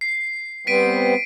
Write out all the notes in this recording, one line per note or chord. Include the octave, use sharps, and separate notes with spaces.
C7
G3 B3 C4 B6 D7 D#7